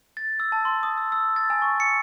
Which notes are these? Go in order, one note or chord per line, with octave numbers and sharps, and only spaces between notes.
A6
E6
A5
C6
D#6
E6
E6
A6
G#5
C#6
C#7